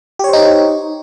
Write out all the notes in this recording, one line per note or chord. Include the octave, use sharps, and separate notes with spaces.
D#4 G4 C5 C#5